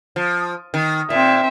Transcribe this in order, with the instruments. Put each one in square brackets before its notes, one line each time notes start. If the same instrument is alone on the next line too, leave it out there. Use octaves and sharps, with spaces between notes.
[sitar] F3
D#3
[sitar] A#2 [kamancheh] C4 E5